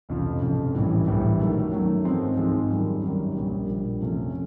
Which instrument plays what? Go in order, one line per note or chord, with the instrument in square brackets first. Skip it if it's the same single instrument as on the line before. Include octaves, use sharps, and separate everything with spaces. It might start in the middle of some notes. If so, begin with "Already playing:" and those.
[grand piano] F1 F2 C#3 F3
F1 F2 C#3 F3
A#1 A2 E3 G3
A#1 A2 E3 G3
F#2 D#3 F#3 A3
F#2 D#3 F#3 A3
G#2 F3 G#3 C4
G#2 F3 G#3 C4
F#2 D#3 G3
F#2 D#3 G3
A#1 A#2 G3
A#1 A#2 G3
F2 C3 F3 A3 C#4